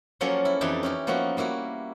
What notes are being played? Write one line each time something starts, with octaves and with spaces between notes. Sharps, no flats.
F3 F#3 A#3 C#4 A4 A#4
E4
F2 E3 D4 D#4 G4 A5
C#4 E4 G4
F3 A#3 B3 D#4 F#4
G3 A#3 E4 F#4